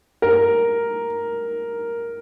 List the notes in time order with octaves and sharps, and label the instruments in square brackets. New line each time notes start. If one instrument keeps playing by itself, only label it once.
[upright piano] A#4